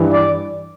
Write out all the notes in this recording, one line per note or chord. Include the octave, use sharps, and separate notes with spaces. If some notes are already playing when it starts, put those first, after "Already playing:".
Already playing: G2 E3 G3
D5